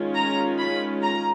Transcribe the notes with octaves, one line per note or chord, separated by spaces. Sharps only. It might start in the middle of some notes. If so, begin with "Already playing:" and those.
Already playing: D#3 G#3 C#4 F4
A#5
B5
A#5